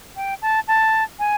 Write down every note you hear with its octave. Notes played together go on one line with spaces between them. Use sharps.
G5
A5
A5
G#5